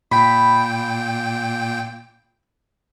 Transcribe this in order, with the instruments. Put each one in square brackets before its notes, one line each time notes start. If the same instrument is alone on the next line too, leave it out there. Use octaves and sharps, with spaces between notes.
[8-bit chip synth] A#2 G5 [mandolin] B5